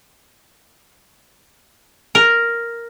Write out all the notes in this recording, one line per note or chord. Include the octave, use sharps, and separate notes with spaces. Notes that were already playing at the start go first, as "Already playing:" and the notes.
A#4